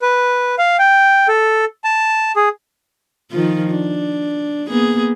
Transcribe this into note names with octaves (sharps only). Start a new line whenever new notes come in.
B4
F5
G5
A4
A5
G#4
D#3 F3 F4
D4
A#3 B3 G#4